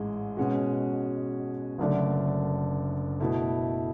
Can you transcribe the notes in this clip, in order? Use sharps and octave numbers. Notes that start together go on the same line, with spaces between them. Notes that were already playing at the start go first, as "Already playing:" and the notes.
Already playing: A1 G#2 G#3
B2 G#3 C#4 F#4
F#1 F#2 D3 A3 D4
B2 A3 E4 A4